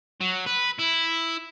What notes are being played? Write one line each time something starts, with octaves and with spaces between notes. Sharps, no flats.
F#3
B4
E4